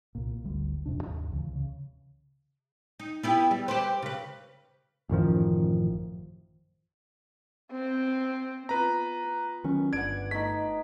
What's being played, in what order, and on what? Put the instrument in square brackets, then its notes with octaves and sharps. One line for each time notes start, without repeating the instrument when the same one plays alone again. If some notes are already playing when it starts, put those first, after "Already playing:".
[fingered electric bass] C2 A#2
G#1 D2 G3
E1 F2 C3 D4
D#2 G#2
C#2 C#3 E3
C#3
[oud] D#4
B3 E4 G4
G3
G4 B4 C5
C#3 B4
[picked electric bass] A1 F#2 D#3 F3
[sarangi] C4
[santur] B3 F4 [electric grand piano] B4 A#5
[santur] C#6
[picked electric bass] D#3 F#3 C#4 [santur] C#6
[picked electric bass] G1 [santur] D4 B4 F#5 [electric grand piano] G#6 D7
[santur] A3 D#4 [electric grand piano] B6